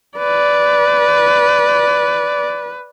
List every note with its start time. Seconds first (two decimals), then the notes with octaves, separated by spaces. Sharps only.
0.19 B4 D5